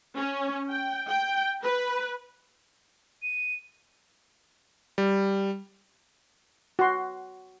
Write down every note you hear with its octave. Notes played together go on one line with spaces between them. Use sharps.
C#4
G5
G5
B4
D#7
G3
F#4 C6